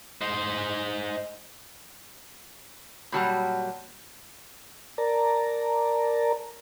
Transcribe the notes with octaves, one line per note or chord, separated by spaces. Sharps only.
D#4 C5
A#2 F#3 G3 F#5 A5 B5
A#4 D5 A5 A#5